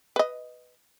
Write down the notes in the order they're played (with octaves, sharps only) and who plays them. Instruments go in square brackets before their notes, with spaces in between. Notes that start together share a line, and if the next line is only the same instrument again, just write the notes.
[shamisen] B4 D#5